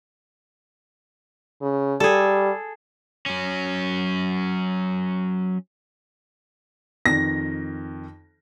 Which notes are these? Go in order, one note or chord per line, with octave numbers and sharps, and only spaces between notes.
C#3
G3 G#4 A4
F#3 C#4
F2 D#3 A#6